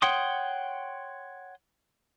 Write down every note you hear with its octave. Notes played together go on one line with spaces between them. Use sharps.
C#5 F#5 G5 C6 D#6